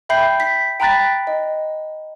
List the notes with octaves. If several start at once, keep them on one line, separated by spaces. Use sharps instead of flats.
E5 G5 B5 G6 C7
B6
G5 A#5 B5 F#6 A6 B6
D#5